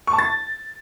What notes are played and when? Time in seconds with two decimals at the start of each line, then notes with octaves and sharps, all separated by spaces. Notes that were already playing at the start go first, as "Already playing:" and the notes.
0.07 C#6
0.13 A5
0.18 A6